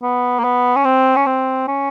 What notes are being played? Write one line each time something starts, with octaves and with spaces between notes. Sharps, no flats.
B3
A#3
B3
C#4
C4
C#4
C4
C#4